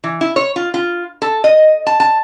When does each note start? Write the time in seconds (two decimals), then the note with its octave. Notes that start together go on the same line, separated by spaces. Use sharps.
0.04 E3
0.21 E4
0.36 C#5
0.56 F4
0.74 F4
1.22 A4
1.44 D#5
1.87 A5
2.00 A5